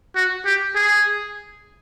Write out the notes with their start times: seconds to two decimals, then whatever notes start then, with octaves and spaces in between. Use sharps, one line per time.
0.15 F#4
0.46 G4
0.75 G#4